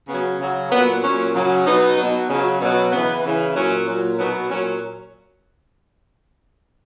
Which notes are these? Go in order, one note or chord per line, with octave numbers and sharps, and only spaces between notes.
C#3 F#3 B3
C#3 F#3
A#2 F#3 B3
A#2 F#3 C#4
C#3 F#3
B2 F#3 B3 D#4
B2 F#3
C#3 F#3
B2 F#3
C#3 E3 B3
C#3 E3
A#2 F#3 C#4
A#2 F#3
B2 F#3 B3 D#4
A#2 F#3 C#4